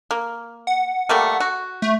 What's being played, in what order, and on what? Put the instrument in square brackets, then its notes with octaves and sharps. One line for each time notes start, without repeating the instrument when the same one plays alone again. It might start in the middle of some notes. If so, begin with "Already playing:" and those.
[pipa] A#3
[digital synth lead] F#5
[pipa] G3 A3 A#3
F#4
[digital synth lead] A3